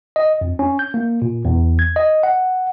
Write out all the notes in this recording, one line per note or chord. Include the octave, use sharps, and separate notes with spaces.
D#5
F2
C#4
G6
A#3
A#2
E2
G#6
D#5
F#5